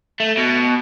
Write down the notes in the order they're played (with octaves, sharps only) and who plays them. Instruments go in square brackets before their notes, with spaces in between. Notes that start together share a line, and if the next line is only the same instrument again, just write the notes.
[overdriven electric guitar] A3
B2